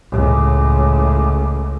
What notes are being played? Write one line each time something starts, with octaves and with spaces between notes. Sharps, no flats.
C#2 A2